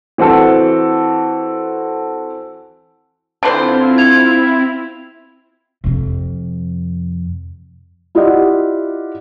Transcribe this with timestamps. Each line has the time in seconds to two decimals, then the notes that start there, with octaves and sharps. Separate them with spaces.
0.18 E3 C4 F#4 A4
3.43 D3 C4 E4 F4 B4 C5
3.98 E4 G#6 F7
5.84 F2 C3
8.15 E4 F4 G4 D5 D#5 F#5